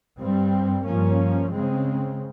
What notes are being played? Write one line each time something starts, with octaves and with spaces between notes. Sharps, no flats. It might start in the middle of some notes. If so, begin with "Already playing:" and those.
G2 G3 C4
G2 F3 A#3 C#4
C#3 G#3 C4